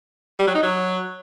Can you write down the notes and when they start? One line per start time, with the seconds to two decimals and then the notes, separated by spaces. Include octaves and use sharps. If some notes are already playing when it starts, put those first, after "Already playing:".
0.39 G3
0.47 F#3
0.55 D#4
0.63 F#3